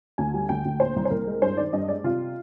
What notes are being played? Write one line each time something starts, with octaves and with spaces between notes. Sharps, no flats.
D2 G#5
G3
D2 G5
D2
A#2 C5
C2
C5
C2 A#4
G#3
G2 C5
D#3 D5
G2 D#5
G#3 D5
C3 F4